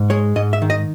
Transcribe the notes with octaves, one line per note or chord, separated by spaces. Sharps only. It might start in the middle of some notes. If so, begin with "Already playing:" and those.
Already playing: G#2
G#3 C#5
G#2 D#5
E5
D#3
D#5